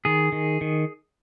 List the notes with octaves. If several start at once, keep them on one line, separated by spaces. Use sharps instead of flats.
D#3 G#4
D#3
D#3